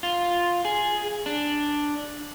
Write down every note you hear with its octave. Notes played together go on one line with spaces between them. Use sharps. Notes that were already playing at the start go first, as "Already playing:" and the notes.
F4
G#4
D4